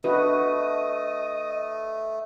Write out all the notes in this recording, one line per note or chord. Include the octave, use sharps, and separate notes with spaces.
A3 D4 F#4 B4 D#5